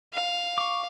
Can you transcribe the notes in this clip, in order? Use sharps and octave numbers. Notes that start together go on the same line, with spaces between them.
F5
C#6 D6